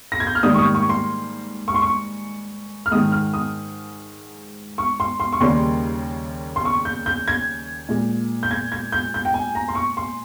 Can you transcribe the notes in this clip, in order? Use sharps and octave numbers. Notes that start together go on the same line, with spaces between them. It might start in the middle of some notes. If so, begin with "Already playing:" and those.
A#6
G#6
G6
F6
G#2 D#3 G3 A#3 D#6
C#6
D#6
C#6
C6
C#6
C6
C#6
F6
G#2 D#3 G#3 D#6
F6
D#6
C#6
C6
C6
C#6
D#2 C#3 G3 A#3 C6
C6
C#6
G6
G6
G#6
A#2 G#3
G6
G#6
G#6
G6
G6
G5
G#5
A#5
C6
C#6
C6